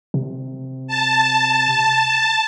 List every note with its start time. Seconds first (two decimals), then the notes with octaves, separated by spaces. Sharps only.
0.14 C3
0.87 A5